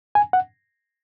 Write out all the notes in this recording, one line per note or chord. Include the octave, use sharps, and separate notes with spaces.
G#5
F#5